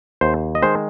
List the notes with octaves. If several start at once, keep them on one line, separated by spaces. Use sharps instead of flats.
D#2 C5
D#5
D#3 G#3 C5